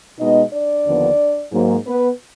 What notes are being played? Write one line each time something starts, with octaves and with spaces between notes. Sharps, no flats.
B2 G#3 B3 D#4 D#5
D4 D5
D#2 D3 F3 B3
G#2 F#3 A#3
B3 B4